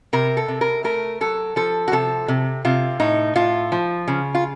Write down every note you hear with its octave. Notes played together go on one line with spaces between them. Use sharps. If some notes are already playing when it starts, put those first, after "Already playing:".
C3 A#4
A4
C3
A#4
A3 A#4
F#3 A4
F3 A4
F#4
C3 A4
C3
C3 F4
A2 D#4
A2 F4
F3
C#3
F4